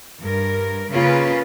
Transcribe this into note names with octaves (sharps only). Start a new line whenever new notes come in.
G2 A#4
C#3 A#3 C#4 F4 B4